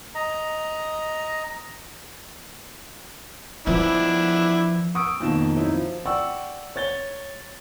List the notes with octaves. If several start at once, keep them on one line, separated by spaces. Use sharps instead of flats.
D#5 A#5
F3 B3 D4 E4
C#6 D#6 E6 D7
F2 B2 D#3 A#3 A5 E7
F#3 D#4 E4
F3
D5 F#5 G5 C#6 E6
C#5 A6 G7